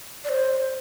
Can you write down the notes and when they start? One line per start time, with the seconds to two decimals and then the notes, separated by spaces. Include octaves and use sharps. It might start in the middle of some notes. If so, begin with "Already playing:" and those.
0.24 D5
0.29 C5